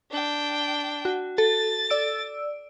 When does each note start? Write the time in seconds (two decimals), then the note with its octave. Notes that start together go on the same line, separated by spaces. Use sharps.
0.11 D4 G5
1.05 F#4
1.38 A4 A6
1.90 D5 E6 D7